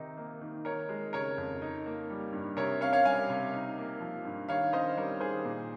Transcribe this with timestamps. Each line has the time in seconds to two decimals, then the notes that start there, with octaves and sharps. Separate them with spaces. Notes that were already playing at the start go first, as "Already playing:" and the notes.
Already playing: C3 D#3 D#4
0.17 A#3
0.41 D#3
0.65 D#4 A#4 C#5
0.89 G#3
1.13 C#3 A#4 C#5
1.38 F2
1.62 D#4
1.86 A#3
2.10 G3
2.33 G2
2.57 C3 A#4 C#5
2.81 C#4 C#5 F5
2.93 C#5 F5
3.05 G3 F5 G#5
3.30 C3
3.54 D#4
3.78 A#3
4.01 F3
4.25 G2
4.49 D#3 C#5 F5
4.73 C#4 C5 D#5
4.97 G3 A#4 C#5
5.20 D#3 G#4 C5
5.45 A#2